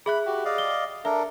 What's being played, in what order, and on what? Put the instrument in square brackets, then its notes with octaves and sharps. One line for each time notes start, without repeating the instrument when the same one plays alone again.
[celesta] G#4 E5 F#6 [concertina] B5
[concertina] F#4 G4
D5 D#5 F5
[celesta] G7
[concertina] D4 A4 A#4 [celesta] E5